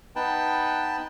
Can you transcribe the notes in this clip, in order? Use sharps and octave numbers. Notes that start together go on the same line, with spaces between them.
B3 D#4 B4 G5 A5